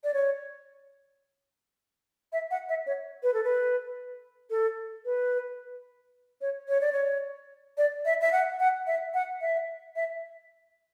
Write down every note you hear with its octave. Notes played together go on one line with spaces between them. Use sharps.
D5
C#5
E5
F#5
E5
C#5
B4
A4
B4
A4
B4
C#5
C#5
D5
C#5
D5
E5
E5
F#5
F#5
E5
F#5
E5
E5